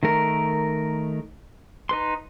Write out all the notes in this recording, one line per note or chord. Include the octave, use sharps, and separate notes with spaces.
D#3 A3 A#4
D#4 B4 C6